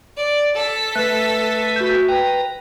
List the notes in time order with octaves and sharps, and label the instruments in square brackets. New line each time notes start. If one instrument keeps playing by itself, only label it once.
[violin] D5
A4 B6
[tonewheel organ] A3 B4 E5 [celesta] F#6
[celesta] F#4 G6
[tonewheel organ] B4 A#5 [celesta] G5